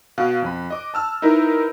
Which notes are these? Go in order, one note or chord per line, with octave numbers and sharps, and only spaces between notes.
B2 F5 F#6
F2 B5
D#5 D6
A5 E6 F6
D#4 E4 A#4 B4